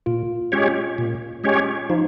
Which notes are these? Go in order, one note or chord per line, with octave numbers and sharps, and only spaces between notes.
A#2 F4
G#3 C#4 G4 C#5
A#2
G#3 C#4 G4 C#5
F3 D#4